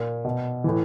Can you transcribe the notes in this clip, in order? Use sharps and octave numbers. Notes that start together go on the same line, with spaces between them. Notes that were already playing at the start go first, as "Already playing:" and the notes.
Already playing: A#2
B2
A2 E3